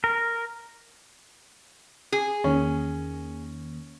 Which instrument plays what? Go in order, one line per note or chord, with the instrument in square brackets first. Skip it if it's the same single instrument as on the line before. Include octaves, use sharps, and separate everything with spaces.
[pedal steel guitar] A#4
[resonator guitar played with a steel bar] G#4
[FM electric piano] E2 D#3 A#3 [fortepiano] C#4